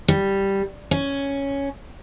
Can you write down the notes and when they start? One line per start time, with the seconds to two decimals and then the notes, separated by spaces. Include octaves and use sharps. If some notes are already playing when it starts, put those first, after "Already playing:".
0.08 G3
0.91 C#4